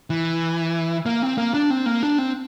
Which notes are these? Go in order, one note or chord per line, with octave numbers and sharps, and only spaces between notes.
E3
A#3
C4
A#3
D4
C4
A#3
D4
C4